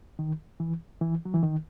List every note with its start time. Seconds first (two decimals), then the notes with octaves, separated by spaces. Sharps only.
0.19 D#3
0.60 E3
1.01 E3
1.25 F#3
1.34 E3
1.43 D#3